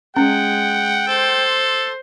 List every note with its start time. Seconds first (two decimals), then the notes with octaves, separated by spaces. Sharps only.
0.17 G#3 C#4 F#5 G5
1.08 A4 C5 C6